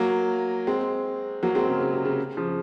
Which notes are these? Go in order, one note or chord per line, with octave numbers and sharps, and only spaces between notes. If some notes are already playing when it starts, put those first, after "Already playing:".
Already playing: F#3 A#3
G#3 C4
F#3 A#3
G#3 C4
C#3
C#3
C3
C#3
C#3 F3